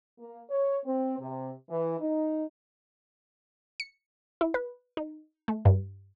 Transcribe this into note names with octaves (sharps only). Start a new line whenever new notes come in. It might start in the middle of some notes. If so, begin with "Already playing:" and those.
A#3
C#5
C4
C3
E3
D#4
C#7
E4
B4
D#4
A3
G2